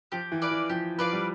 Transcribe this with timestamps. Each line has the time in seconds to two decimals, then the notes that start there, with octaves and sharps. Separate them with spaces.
0.12 F3 G4
0.32 E3
0.42 B4 D5 F5
0.51 E3
0.69 F3 G4
0.98 F3 B4 D5 F5
1.13 G3